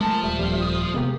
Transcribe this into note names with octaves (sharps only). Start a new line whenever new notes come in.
F3 G#3 A3 A#4 A5
D#1 G3 E5
F2 G3 A3
D#6
C3 G#3 A#3 B3 G4